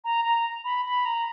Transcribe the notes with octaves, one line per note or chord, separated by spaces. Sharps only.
A#5
A#5
B5
B5
A#5